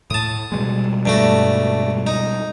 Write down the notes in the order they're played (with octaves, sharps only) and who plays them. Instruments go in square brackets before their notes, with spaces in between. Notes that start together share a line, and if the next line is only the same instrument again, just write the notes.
[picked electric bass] A2 [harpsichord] A5 D#6
[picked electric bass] B2 G3 G#3
[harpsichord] G2 A3 F#4
D#4